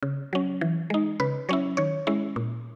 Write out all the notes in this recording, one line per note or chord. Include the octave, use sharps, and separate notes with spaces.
C#3
F#3 C#4
E3
G#3 D#4
C#3 B4
F#3 C#4 E4 C#5
D#3 C#5
G#3 C#4 E4
A#2